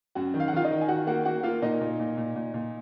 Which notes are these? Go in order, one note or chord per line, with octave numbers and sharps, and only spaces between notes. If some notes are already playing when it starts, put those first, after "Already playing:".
F#2 F#4 F#5
D#3
F5
F#5
D#3 F4 F5
D#4 D#5
D#3
G#5
D#3 F#4 F#5
A#3 F#4 F#5
A#3 F#4 F#5
A#3 F4 F5
A#2 D#4 D#5
A#2
A#2
A#2
A#2
A#2